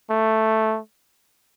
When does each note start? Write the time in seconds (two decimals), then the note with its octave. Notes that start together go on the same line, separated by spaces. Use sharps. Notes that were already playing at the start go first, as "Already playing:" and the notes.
0.10 A3